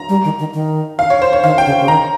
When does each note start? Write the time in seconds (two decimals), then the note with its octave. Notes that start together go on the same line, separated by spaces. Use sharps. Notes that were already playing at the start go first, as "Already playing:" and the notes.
Already playing: A#5
0.09 G3
0.24 D#3
0.39 D#3
0.54 D#3
0.99 F5
1.10 C#5
1.22 C5
1.33 C#5
1.43 D#3 F5
1.58 G5
1.66 C#3
1.80 C#3
1.88 D#3 A#5